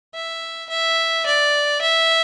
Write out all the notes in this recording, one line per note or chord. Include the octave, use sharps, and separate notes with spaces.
E5
E5
D5
E5